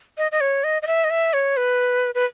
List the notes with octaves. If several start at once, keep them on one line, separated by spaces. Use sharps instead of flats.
D#5
D#5
C#5
D#5
D#5
E5
D#5
E5
C#5
B4
B4